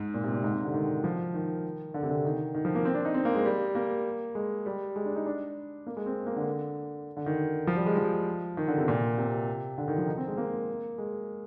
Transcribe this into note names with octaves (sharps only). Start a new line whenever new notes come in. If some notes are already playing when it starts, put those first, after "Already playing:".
Already playing: G#2
A#2
C3
A#2
G#2
C3
D3
D#3
F3
D#3
D3
C3
D3
D#3
D#3
F3
A#3
C4
D4
D#4
C4
A#3
G#3
G3
A#3
G#3
G3
G#3
D4
D#4
D4
A#3
G#3
C4
A#3
D3
D3
D#3
F3
G3
G#3
F3
D#3
D3
C3
A#2
C3
D3
D#3
F3
D#4
C4
G#3
A#3
G#3